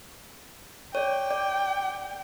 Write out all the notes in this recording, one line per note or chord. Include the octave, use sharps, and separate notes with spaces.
C#5 D5 G5
D5